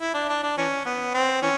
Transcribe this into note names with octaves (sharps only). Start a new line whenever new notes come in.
E4
D4
D4
D4
E3 C#4
B3
C4
E3 C#4